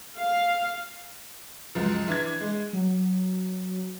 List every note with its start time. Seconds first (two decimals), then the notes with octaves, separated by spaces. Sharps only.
0.18 F5
1.75 C#2 F#2 F3
2.08 E3 D4 G#6
2.41 G#3
2.73 F#3